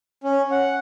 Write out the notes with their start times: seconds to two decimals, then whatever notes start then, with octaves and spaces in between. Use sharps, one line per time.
0.24 C#4
0.51 F#5